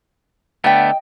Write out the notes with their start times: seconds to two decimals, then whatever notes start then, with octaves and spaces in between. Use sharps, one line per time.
0.64 D3 A3 B3 D#5 G5